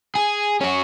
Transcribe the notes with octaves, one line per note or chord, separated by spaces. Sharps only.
G#4
C#4 F#4